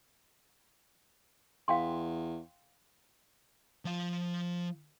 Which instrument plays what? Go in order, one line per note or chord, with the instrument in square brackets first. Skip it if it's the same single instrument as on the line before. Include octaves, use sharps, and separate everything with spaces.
[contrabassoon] E2 [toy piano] F5 G5 C6
[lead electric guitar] F3 F5